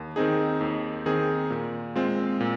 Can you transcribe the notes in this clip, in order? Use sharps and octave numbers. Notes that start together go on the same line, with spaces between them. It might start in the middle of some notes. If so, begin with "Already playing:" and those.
Already playing: D#2
D#3 C4 D#4 G#4
D#2
D#3 C4 D#4 G#4
A#2
G#3 C4 F4
A#2